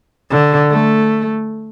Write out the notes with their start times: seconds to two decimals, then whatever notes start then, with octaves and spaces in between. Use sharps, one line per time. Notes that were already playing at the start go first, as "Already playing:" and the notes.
0.31 D3
0.71 A3